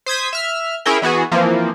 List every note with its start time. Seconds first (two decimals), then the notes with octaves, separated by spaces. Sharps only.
0.06 C5 D#6 G#6 B6
0.33 E5 F6
0.86 C#4 E4 G#4 A#4 G5
1.02 E3 B3 F#4 G#4
1.31 E3 F3 A#3 C4